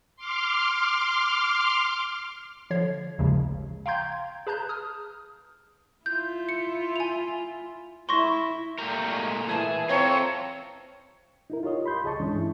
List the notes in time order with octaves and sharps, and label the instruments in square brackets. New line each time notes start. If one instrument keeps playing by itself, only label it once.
[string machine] C6 D6 F6
[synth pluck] D3 F3 C#5 G#6 C7
A1 D#2 C#3 F3 G#3
F5 G5 A#5 C6 G6 G#6
G#4 B4 A5 A#5 F#6 G6
D#6 F6
[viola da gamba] E4 F4 [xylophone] G6
[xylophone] C#7
G#5 F7
[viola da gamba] E4 [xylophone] C6 C#6 A#6
[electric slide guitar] A#2 A3 A#4 [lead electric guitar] F#4 G4
[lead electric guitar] G#3
[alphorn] E3 [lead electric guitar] G#4 [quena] A5
[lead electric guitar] F#2 A#5 [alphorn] C4 [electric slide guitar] F4 A4 [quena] C#5
[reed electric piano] D#4 E4 A#4
F4 G4 C#5 D#5
B5 C6 G6
C#2 G#4 D#5 A5 C#6
G2 E3 G#3 C#4 D4
E4